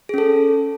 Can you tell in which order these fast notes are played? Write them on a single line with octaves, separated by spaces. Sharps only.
G#4 C#4 A4